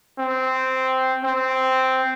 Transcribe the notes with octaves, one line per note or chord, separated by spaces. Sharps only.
C4
C4